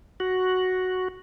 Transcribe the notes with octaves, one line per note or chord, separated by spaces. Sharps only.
F#4